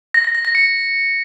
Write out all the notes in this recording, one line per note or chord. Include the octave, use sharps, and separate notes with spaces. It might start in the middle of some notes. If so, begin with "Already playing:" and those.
A#6
A#6
A#6
A#6
C#7